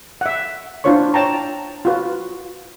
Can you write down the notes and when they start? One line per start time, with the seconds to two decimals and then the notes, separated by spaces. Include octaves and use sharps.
0.21 E5 F#5
0.84 D4 E4 F4 C5 C#5 C#6
1.14 C#5 G5 A5 A#5
1.85 F4 F#4 B4